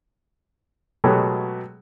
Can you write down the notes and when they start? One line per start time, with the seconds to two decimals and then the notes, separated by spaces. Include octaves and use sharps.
1.04 B2 F#3 G#3 A3 G4 G#4